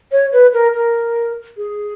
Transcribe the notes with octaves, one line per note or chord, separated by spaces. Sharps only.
C#5
B4
A#4
A#4
G#4